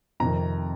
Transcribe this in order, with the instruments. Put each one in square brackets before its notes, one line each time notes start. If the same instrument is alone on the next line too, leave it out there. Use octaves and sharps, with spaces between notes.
[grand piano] F2 C3 D#3 A#5